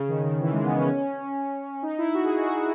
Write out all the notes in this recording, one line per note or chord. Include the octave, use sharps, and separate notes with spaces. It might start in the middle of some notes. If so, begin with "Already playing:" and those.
Already playing: C#3
D#3
D#3
E3
G#3
B3
C#4
D#4
E4
F#4
G#4
F#4
F#4